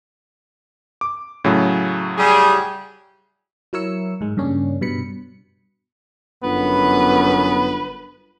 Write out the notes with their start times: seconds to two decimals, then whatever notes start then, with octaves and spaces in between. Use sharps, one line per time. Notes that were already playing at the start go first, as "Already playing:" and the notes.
1.01 D6
1.44 A2 C#3 F#3
2.18 G3 G#4
3.73 F#3 E4 A#4 C#5 E6 C#7
4.21 G#2 G#3
4.37 G2 C#3 A#3 C#4 D4
4.81 G2 B2 B5 C#7
6.43 G1 F#2 B3 B4